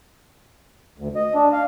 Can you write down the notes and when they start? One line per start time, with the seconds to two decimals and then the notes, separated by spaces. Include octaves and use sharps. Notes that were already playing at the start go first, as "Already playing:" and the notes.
0.98 D2
1.15 D#5
1.34 D4
1.53 F5